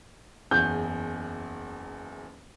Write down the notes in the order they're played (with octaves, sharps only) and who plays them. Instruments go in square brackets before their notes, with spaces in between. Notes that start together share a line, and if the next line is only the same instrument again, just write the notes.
[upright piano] F#1 E2 G#4 [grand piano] G6